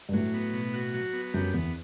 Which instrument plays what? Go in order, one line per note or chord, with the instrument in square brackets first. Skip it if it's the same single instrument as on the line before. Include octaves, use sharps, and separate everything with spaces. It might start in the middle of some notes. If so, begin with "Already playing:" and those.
[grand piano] G2
[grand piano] A2 [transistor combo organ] F#3
[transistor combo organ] B3
B2
F#4
F#3
B3
[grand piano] F#2 [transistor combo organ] G3
[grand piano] E2 [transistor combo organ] B3